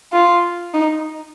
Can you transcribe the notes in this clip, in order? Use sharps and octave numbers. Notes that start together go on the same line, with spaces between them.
F4
D#4